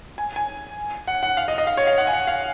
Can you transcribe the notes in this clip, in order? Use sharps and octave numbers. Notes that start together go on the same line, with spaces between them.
G#5
G#5
F#5
F#5
F5
D#5
D#5
F5
C#5
F5
F#5
G#5
F#5
F5